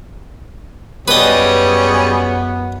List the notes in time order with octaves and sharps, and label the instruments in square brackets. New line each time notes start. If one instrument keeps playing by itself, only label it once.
[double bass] F#2 [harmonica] G3 C#4 G#4 [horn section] B3 [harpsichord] B4 D#5